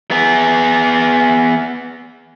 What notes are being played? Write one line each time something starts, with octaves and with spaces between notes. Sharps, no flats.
B3 G#4